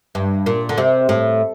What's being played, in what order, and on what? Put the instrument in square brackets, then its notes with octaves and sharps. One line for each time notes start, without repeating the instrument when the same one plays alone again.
[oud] G2
A#2
D3
C3
A2